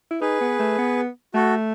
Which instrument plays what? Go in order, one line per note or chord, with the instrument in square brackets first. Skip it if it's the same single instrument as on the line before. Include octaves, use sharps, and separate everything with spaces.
[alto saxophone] E4
[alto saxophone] D#4 [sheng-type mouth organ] G#4 B4
[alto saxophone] B3
A3
B3
[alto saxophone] A3 [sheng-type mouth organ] F#4 A4